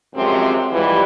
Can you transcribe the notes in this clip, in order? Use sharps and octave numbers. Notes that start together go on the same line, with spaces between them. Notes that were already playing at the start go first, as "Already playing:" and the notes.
F#2 C3 F3 G#3 C4
G#2 E3 F3 G3